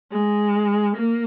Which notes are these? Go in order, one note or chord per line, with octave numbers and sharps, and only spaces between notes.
G#3
A#3